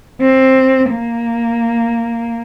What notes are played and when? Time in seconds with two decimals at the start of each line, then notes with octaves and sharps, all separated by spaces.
0.21 C4
0.91 A#3